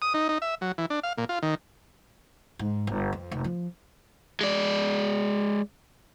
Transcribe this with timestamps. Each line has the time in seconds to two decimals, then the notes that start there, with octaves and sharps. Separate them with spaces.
0.02 D#6
0.14 D#4
0.29 D#4
0.42 E5
0.61 F#3
0.78 E3
0.90 D4
1.03 F5
1.18 A#2
1.29 F4
1.43 D#3
2.59 G#2
2.87 G1
3.12 F2
3.31 F1
3.44 F3
4.41 G#3 D5